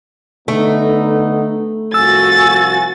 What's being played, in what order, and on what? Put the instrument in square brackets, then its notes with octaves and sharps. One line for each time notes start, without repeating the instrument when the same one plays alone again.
[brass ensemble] D3 B3 D#4 [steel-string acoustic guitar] A3
[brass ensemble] C2 F3 G#5 [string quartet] F#4 A6 [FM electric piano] E6